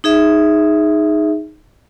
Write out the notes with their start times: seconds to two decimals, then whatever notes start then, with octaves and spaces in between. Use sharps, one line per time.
0.04 D#4 G#4 E5